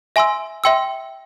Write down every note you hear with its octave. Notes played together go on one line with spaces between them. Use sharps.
E5 G#5 C6 E6
E5 G5 C6 E6